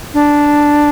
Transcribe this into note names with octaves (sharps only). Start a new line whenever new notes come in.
D4